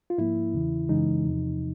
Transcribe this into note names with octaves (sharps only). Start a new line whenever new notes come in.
F4
G#2 F3 A#3 E4
E2 C#3 E3
F#2 C#3 E3 G#3 D#4
E2 C3 F3